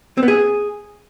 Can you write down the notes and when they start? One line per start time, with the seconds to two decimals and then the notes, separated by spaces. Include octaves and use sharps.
0.17 C4
0.23 B3
0.28 G#4